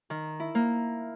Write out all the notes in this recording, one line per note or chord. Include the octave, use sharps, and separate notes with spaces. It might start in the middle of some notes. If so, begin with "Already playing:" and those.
D#3
E4
A#3